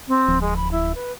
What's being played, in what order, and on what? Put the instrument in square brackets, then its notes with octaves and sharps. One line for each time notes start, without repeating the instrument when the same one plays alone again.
[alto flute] C4
[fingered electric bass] D1 F3
[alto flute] G#3
B5
E4
B4